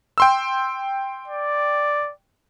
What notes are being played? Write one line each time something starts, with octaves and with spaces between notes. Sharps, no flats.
G5 C6 E6
D5